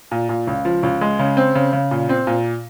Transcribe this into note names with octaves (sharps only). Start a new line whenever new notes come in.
A#2
A#2
C#2
F3
C#2
G#3
C#3
C4
C#3
C#3
A#2
C4
A#2